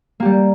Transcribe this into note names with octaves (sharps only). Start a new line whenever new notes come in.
G3 A#3 G4